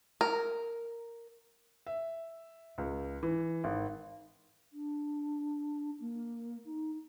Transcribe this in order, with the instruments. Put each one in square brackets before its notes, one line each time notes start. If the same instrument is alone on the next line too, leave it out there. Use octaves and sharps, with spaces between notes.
[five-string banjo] A#4
[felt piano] E5
C#2
E3
G#1
[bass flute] D4
A#3
D#4